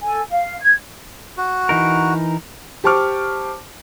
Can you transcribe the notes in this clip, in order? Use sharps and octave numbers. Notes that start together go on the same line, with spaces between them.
A4 G#5
F5
G#6
F#4
E3 D#4 A#4
G4 C5 A5 C#6 D6 F6